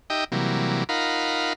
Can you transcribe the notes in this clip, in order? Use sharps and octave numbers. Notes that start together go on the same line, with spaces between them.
D#4 G4 D#5 E5 G5
C3 E3 F#3 G3 A#3
D#4 F4 A#4 F5 F#5 B5